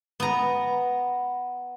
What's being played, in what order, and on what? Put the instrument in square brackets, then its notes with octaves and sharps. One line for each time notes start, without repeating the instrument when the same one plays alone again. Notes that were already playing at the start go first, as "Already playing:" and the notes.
[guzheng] B3 A#5